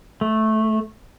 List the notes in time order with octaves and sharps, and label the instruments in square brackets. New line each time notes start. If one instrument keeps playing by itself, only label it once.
[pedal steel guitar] A3